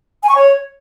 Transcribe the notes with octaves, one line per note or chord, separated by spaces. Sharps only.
G#5
C#6
C#5